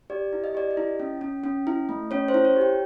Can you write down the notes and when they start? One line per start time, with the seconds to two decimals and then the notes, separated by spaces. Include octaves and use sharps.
0.10 G4 D5
0.33 E4
0.44 D#5
0.55 G4 D5
0.71 D#5
0.77 E4
1.00 C#4
1.21 C#4
1.44 C#4
1.67 E4
1.89 A3
2.11 C#4 C#5
2.28 C5
2.34 E4
2.45 C#5
2.56 G4
2.61 G5